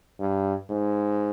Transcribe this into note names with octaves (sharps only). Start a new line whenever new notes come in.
G2
G#2